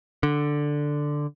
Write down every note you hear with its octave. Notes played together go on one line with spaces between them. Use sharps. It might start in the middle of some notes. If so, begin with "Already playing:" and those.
D3